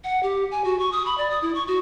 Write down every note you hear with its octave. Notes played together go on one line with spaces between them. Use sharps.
F#5
G4
G#5
F#4
C#6
D#6
B5
D5
D#6
E4
C#6
F#4